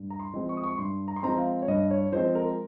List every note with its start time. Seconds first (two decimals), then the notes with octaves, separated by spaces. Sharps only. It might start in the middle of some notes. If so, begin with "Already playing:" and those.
Already playing: G2
0.10 A#5
0.20 C6
0.34 F3 G#3 C4
0.49 C#6
0.57 D#6
0.64 C#6
0.78 G2 C6
1.08 A#5
1.16 C6
1.23 F3 G#3 C4 A#5
1.38 F5
1.62 C#5
1.68 G2 D#5
1.91 C#5
2.12 F3 G#3 C4 C5
2.35 A#4